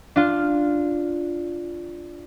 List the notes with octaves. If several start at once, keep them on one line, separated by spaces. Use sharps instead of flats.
D4 F4